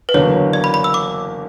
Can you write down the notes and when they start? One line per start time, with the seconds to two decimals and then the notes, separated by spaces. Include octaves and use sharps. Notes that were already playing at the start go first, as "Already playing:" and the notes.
0.09 B4
0.14 F#1 E2 D3 F#3 C#5
0.53 D5
0.64 B5
0.74 B5
0.84 E6
0.94 D6